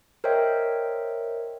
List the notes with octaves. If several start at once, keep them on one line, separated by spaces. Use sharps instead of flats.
A#4 C5 C#5 D#5 E5 G5